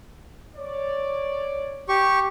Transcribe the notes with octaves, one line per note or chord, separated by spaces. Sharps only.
C#5 D5
G4 C#6